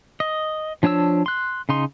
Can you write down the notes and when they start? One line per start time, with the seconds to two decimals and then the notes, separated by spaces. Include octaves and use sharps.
0.20 D#5
0.83 F3 D4 C#5 A5 E6
1.26 C6 F#6
1.69 C#3 D#4 C6